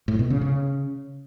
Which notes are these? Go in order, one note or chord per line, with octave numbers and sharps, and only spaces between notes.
A2
B2
C#3
C#3